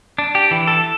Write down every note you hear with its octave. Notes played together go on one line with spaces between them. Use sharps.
D4
G4
E3
A4